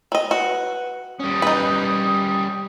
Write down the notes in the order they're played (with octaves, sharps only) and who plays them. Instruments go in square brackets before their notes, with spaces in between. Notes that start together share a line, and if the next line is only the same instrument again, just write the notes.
[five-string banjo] F#3 D#5 [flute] G5
[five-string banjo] F#4 [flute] B4
[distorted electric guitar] G3 C#4 [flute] D#6
[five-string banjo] D#4 B4